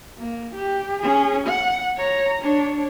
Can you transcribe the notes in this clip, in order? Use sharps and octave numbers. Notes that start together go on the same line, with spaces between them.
A#3
G4
C#4 G#4
F#5
C#5 A#5
D4 C#5